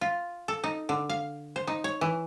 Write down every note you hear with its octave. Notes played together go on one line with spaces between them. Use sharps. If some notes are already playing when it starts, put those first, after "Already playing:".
F4
A4
D#4
D3
F5
C5
D#4
C#5
E3